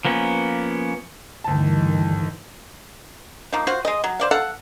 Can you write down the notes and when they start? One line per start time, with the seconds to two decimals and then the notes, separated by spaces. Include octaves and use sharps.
0.05 F3 A#3 B3 C#4
1.44 D2 G2 D#3 E3 A5
3.53 F3 A#3 D#4
3.67 F4 F#4 C5
3.85 G#3 D#5
4.04 F#3
4.20 C5 D5 F5
4.31 A4 F5 F#5